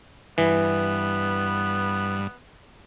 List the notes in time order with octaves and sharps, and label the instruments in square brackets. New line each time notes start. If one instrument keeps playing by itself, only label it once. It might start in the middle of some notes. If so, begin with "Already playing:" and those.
[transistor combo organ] G2 [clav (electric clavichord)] E3 [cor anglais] B3